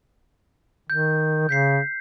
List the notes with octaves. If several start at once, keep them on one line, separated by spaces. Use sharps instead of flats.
D#3 G6
C#3 G6 B6 C7